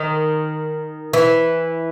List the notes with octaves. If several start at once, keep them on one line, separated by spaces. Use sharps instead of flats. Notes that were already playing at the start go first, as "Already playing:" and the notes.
Already playing: D#3
E3